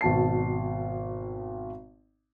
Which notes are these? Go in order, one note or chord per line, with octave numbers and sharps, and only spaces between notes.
G#1 B2 A5 C7